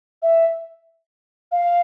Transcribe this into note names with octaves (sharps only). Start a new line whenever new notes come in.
E5
F5